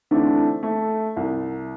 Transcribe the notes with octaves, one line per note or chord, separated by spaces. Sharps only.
D3 E3 A3 C4 D4
A3
C2